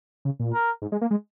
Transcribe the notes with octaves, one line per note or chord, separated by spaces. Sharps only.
C#3
A#2
A#4
G#2
G#3
A#3
G#3